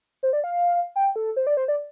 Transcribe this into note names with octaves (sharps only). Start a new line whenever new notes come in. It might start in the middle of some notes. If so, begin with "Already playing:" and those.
C5
D5
F5
G5
A4
C5
D5
C5
D5